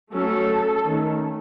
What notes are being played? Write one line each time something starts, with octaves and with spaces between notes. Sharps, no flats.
F#3 A3 C#4 A4
D#3 A3 C#4